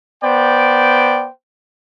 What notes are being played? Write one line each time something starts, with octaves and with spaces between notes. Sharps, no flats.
B3 C5 D5 G5